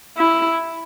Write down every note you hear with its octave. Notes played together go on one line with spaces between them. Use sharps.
E4